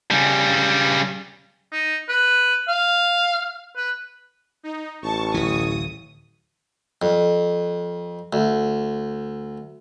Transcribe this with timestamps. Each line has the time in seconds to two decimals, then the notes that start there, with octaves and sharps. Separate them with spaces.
0.11 C#3 G3
1.72 D#4
2.09 B4
2.68 F5
3.76 B4
4.63 D#4
5.02 A1 A5 C#6
5.34 D1 E3 D#6
7.02 F2
8.33 D2